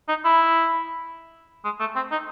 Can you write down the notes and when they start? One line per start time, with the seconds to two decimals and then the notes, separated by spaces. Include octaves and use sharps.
0.09 D#4
0.25 E4
1.65 G#3
1.80 A3
1.96 C4
2.12 D#4